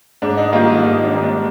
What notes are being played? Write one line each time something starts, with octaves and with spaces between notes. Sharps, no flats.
G#2 D4
D#4
D#3 G3 A#3 F4
F4
G#2 D#4
D4
D#3 G3 A#3
D4